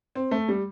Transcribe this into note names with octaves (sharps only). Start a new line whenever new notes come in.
C4
A3
G3